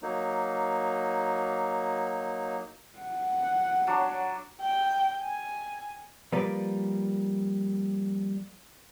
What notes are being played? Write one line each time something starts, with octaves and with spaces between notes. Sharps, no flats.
F#3 A#3 D#4
F#5
F#3 D4
G5
G#5
F3 G3 A#3 A#4 B4 D5